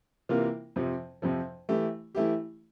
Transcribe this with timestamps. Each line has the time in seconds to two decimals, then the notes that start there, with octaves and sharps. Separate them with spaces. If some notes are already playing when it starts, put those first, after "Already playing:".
0.29 C3 E3 A#3 F4 A#4
0.76 F2 C3 F3
1.22 F2 C3 F3
1.69 E3 A3 E4 G4
2.15 E3 A3 E4 G4